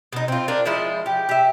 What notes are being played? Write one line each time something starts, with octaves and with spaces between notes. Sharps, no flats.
B2 D#4
C4 F4
D4 A#4
F3 G#3 E4 F4
G4
G4 E5